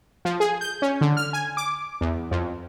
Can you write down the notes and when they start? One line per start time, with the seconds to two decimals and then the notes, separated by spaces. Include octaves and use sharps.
0.25 F3
0.40 G#4
0.61 G6
0.82 C#4
1.01 D3
1.17 F6
1.33 G#5
1.57 D6
2.01 E2
2.31 F2